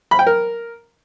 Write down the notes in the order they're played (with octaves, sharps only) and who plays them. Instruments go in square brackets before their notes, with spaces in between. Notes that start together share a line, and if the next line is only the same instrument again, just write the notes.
[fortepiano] B5
G5
A#4